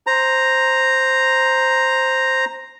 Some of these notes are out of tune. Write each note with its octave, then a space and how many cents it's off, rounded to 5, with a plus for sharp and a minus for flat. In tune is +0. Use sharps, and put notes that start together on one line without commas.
C5 +0 A#5 +0